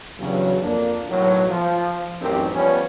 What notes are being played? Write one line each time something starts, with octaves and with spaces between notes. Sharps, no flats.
E2 G2 C#3 F#3
F2 A#3 D4
B1 A2 D#3 F#3
F3
A1 F#2 C4 D#4 G4 A#4
F3 G3 B3 C#4